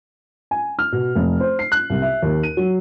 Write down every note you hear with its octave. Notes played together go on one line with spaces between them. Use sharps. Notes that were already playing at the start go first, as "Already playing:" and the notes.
G#5
F6
B2
F1
C5
C7
F#6
C2
E5
D#2
D#7
F#3